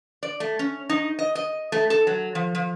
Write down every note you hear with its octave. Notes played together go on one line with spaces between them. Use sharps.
D5
A3
C#4
D#4
D#5
D#5
A3
A4
F#3
F3
F3